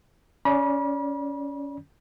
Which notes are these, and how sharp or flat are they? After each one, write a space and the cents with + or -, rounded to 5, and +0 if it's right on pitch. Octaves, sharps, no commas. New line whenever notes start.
C#4 +20 D5 +0 B5 -40